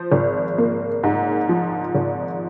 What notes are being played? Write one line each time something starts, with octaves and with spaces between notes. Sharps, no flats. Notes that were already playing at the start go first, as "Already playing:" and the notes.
Already playing: F3 C5
G#1
A#3
G#2
F3
G#1